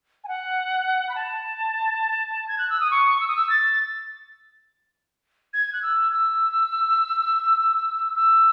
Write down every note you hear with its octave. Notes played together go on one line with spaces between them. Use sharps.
G#5
F#5
B5
A5
G#6
F#6
E6
D#6
C#6
E6
D#6
E6
A6
G#6
F#6
E6
E6
E6